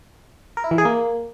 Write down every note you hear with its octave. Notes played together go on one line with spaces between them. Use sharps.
A#4
E4
E3
G#4
A#3